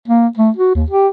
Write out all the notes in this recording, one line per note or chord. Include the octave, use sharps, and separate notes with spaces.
A#3
A3
F#4
D#2
G4